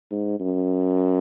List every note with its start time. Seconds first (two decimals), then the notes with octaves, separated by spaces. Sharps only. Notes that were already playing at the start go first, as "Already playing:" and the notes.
0.11 G#2
0.40 F#2